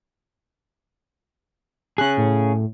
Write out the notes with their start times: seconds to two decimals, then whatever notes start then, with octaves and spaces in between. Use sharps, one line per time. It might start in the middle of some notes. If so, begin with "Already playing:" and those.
1.98 C#4 G#4 F#6
2.17 A2